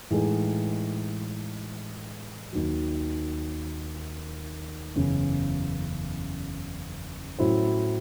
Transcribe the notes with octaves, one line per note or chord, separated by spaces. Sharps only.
A2 E3 G#3 D#4 G#4
D#2 D#3 F#3
F#1 E2 C#3
A2 F#3 C#4 E4 C5